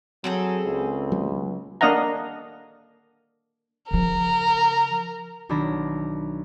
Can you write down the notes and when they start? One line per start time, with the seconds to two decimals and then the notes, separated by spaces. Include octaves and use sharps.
0.24 F#3 C4 G#4 A4
0.66 C#2
1.12 F#3 A#3 B3
1.81 A#3 D4 D#5 F5 F#5 A#5
3.91 C#3 F3 A#4
5.49 B1 D#3 D4 B5 A#6